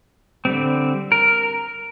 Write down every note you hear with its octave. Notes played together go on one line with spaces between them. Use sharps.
D3 G3 C4
A#4